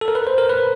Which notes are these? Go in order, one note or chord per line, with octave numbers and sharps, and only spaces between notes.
A4
A#4
B4
C5
A#4
B4